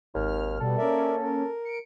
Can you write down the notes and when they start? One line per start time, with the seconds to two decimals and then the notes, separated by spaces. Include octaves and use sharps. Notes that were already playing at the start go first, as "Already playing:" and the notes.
0.15 G#1 D#2 F6
0.60 B2 G3 A4
0.78 A#3 C#4 A#4 D5 E5
1.23 A#4
1.65 C#7 D7